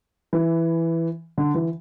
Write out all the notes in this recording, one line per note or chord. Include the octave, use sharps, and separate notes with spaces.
E3
D3
E3